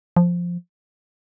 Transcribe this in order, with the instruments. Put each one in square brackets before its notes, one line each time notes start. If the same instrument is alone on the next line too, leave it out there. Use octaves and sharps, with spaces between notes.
[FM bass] F3